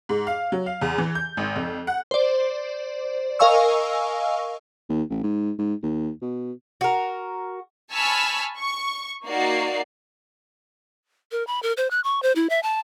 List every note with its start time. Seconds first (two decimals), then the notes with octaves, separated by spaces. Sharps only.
0.09 G#2
0.27 F5
0.52 F#3
0.66 F5
0.81 E2
0.98 E3
1.15 G6
1.37 G#1
1.56 F2
1.87 F#5
2.11 C5 D5
3.39 A#4 D#5 F5 G#5 C#6 E6
4.90 D#2
5.10 A1
5.23 G#2
5.58 G#2
5.83 D#2
6.22 B2
6.81 F#4 A#4
7.93 G#5 A5 B5 C#6 E6 F6
8.59 C#6
9.25 A#3 D#4 F#4 D5 C7
11.32 A#4
11.47 B5
11.63 A#4
11.77 C5
11.91 F#6
12.04 C#6
12.23 C5
12.36 E4
12.50 E5
12.63 A5